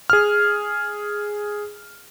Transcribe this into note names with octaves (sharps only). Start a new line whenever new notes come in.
G#4 F6